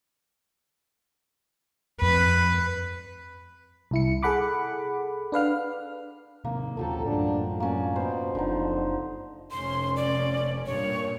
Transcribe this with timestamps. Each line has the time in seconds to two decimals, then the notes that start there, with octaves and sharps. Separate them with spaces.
2.02 F2 C4 B4
3.91 C2 E4 C#7
4.23 G#4 A4 F#5 B5 D6
5.32 D4 B4 F5 F6
6.45 C3 D#3 A#3
6.77 D#1 C#3 F3 F#3 G4 A4
7.06 F#2 A2 D4
7.60 F#3 A#3 C#4 D5
7.96 B2 C5 B5
8.35 F#1 F2 D3 F3 D#4
9.51 F1 C#4 C6
9.96 D5
10.66 G2 A#2 C#5